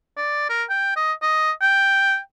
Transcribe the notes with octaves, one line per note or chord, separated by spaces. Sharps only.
D5
A#4
G5
D#5
D#5
G5